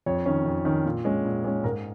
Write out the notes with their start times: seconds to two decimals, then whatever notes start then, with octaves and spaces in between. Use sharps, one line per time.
0.06 F2 C#5
0.26 D#3 C#4
0.46 F2
0.65 D#3 C#4
0.85 A#2
1.05 G#3 C#4
1.25 A#2
1.44 G#3 C#4
1.64 G#2 A#4